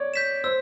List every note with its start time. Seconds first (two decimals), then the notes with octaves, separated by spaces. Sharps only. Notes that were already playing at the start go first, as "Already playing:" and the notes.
Already playing: C#5 D5
0.14 G6 B6 E7
0.44 C5 E6